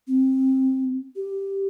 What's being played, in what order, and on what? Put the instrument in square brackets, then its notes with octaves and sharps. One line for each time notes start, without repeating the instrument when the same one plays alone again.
[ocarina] C4
G4